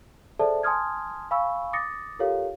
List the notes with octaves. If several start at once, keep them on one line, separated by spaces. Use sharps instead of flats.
G#4 A4 C5 D5 E5 A5
G#5 A5 C6 D#6 F6 G#6
F5 G#5 B5 C#6 E6
D6 D#6 A6 A#6 C#7
F4 G4 A4 A#4 C#5 F5